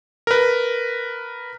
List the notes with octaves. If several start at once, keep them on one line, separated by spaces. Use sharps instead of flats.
A#4 B4